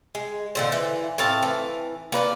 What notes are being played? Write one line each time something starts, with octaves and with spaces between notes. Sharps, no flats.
G#3
A#2 D3 C5
E3
A2 C4 F5 A5
E3
A#3 B4 C#5 D5